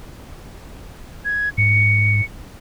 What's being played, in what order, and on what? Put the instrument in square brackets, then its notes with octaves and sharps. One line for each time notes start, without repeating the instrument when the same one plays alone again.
[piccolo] G#6
[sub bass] G#2 [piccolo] C#7